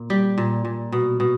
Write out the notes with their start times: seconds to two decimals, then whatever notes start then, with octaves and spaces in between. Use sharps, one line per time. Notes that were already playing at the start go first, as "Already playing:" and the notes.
Already playing: A#2
0.10 G3 G4
0.38 A#2
0.65 A#2
0.92 B2
1.20 B2